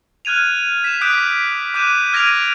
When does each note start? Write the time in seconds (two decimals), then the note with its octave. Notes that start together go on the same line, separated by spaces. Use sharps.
0.25 F6 F#6 G#6 D#7 F7
0.84 B6 E7
1.01 D6 D#6 F#6 G6 B6 D7
1.74 D6 F#6 G6 D#7 E7
2.13 F6 G#6 A#6 D7 D#7 F7